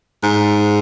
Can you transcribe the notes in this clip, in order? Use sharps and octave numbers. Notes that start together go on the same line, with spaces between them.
G#2